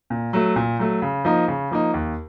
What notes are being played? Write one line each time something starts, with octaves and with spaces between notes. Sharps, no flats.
A#2
F#3 A3
A#2
F#3 A3
C#3
F3 A#3 D#4
C#3
F3 A#3 D#4
D#2